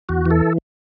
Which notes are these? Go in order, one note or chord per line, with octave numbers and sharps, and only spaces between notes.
E2 F#4
E3
A4